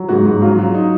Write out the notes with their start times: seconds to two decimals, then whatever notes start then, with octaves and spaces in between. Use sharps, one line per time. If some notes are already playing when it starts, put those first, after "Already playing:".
Already playing: F#3
0.08 G#2 F#4
0.25 G#2
0.42 F#3 F4
0.58 F#3
0.74 D#4